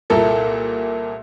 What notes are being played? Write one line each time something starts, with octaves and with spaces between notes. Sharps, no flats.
C2 A#2 A#3 E4 A4 A#4